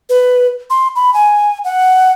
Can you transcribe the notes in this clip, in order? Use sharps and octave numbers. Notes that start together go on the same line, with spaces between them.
B4
C6
B5
G#5
F#5